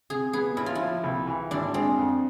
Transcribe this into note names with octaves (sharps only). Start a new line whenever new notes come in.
C3 G#4
B3 G#4
A1 E4
F4
F3 E4
C2
E3
G#1 D4
G#3 C4
F2